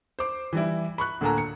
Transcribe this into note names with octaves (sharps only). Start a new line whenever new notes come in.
C5 D6
E3 G3 E4
B5 C#6 F#6
D2 A2 A#3 A4 G#5 A#5
C#7